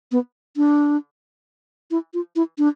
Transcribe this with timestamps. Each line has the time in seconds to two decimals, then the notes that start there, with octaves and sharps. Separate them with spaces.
0.12 B3
0.57 D4
1.91 E4
2.14 F4
2.36 E4
2.58 D4